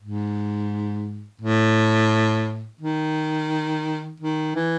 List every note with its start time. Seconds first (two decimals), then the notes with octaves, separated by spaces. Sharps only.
0.02 G#2
1.41 A2
2.81 D#3
4.20 D#3
4.55 E3